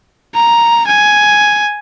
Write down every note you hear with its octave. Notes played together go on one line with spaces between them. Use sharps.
A#5
G#5